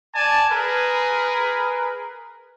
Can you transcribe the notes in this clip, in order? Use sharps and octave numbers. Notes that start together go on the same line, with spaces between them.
D5 G#5 A5
G#4 A#4 B4